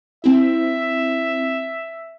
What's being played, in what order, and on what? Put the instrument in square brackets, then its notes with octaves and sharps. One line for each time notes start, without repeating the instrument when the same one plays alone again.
[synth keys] C4 E4 [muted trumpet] E5